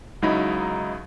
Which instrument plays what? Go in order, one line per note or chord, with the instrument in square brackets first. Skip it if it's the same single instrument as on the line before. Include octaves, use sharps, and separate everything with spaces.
[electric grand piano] C#2 F#3 D#4 E4 A#5 B5